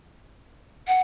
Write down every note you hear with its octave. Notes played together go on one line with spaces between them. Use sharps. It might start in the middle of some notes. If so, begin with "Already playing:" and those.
F#5